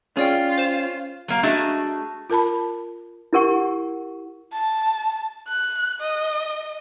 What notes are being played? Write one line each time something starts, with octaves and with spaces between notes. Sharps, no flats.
C#4 F4 G#4 D5 G5
C5 E7
F#3 A#3
A3 D4 F#4 G#4 D#5
F4 A#4 A5 B5
E4 G4 A#4 F#5 C#6
A5
F#6
D#5